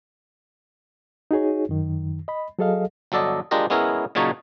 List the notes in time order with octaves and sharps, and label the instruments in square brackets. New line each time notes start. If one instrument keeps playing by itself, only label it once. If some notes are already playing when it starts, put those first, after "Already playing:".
[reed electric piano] D#4 F#4 G#4 C#5
F#2 D#3
D#5 B5
F#3 G#4 A4 D#5 F5
[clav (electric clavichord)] G1 F#3 A4 D5 D#5
G#3 D4 F4 G4 A#4 D#5
G#3 B3 C#4 E4 G#4 A#4
A#2 C#3 F#3 D#4 C#5 A5